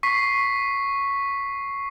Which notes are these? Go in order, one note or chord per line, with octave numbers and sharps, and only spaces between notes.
C#6 B6 C7